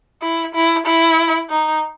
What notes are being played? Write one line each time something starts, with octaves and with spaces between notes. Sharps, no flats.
E4
E4
E4
D#4